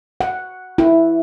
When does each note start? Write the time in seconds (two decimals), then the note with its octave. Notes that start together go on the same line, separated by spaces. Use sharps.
0.21 F#5
0.78 E4